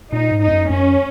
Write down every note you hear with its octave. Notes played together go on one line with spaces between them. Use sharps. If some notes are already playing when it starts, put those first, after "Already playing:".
A#2 D#4
G#2
F2 D#4
F#2
F#2 C#4